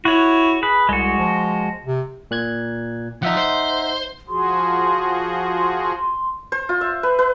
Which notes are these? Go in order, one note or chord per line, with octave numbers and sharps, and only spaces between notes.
E4 F#4 C#5
G#4 B4
C2 G#3 F#4
F3
C3
A#2 F#6 G#6
F3 D#4 E5 F#5
C5
F3 F#4 G#4 C6
C5
F4
E5
B4
B4